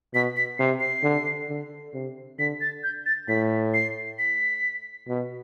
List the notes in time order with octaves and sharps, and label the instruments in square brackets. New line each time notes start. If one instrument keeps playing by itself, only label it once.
[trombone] B2 [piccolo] B6
[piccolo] B6
[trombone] C3 [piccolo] C7
[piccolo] C7
[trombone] D3
D3
C3
[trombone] D3 [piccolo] B6
[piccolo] A6
G6
A6
[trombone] A2 [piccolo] B6
[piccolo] C7
B6
[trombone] B2